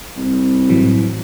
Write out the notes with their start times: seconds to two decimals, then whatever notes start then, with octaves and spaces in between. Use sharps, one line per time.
0.17 C2
0.69 A2 E3 F#3